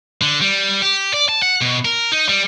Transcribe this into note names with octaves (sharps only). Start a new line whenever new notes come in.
D3
G3
G4
D5
A5
F#5
B2
A#4
D#4
G3